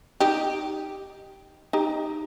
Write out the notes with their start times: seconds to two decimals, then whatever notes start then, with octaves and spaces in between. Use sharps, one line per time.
0.20 D#4 G4
1.73 D#4 G4